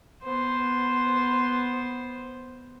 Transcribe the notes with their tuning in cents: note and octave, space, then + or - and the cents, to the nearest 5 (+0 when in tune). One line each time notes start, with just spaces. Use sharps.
B3 +0 C5 +0